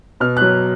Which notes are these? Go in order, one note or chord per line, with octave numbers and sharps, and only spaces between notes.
B2 F6
F#3 F#6